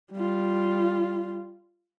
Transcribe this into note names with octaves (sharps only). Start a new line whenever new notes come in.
G3 F4